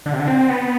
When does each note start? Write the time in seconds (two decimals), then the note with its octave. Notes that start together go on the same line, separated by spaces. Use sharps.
0.06 D3
0.13 C3
0.19 D3
0.27 C4
0.50 B3